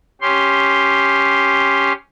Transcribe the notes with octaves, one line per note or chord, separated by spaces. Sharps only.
C#4 G4 C6